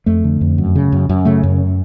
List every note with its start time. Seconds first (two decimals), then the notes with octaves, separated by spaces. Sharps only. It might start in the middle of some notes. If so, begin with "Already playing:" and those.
0.06 F2 A3
0.24 D3
0.41 F2
0.58 F#2
0.75 C#3
0.92 F#2
1.09 F#2
1.25 C#3 A3
1.43 F#2